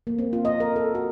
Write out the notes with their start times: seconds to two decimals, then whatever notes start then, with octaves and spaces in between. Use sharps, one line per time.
0.07 A#3
0.19 C4
0.33 F4
0.45 D#5
0.60 A#4
0.76 A4
0.95 F#4